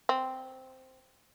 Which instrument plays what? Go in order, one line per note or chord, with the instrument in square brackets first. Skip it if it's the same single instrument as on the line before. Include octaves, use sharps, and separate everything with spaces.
[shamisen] C4